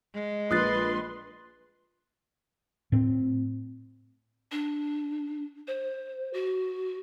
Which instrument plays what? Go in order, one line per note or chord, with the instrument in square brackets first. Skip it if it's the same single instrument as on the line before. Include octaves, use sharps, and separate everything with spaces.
[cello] G#3
[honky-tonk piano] A#1 [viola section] B4 C6 [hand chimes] D#6 F#6 A6
[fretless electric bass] A2 C4
[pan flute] D4
C5
F#4